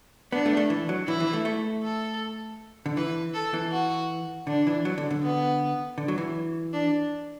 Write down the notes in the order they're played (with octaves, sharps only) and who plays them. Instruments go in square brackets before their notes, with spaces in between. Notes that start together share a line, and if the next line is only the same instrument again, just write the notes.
[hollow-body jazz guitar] B3 [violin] D4
[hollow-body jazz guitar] A3
A3
E3
F#3
[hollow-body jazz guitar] E3 [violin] E4
[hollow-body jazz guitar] E3
A3
A3
[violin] A4
[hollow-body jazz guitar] D3
[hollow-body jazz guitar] E3 [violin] B4
[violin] A4
[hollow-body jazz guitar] E3
[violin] F#4
[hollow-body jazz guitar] D3 [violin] D4
[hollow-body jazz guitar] E3
F#3
D3
D3
[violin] B3
[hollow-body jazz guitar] D3
F#3
E3
[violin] D4